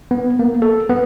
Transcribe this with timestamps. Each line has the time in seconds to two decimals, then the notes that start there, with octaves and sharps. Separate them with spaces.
0.11 B3
0.39 A#3
0.62 A4
0.89 B3